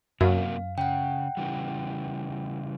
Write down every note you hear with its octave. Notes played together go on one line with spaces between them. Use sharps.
F#2 C3 A#3 F#4 F5
C#3 F#5 G5
C#3 E3 G3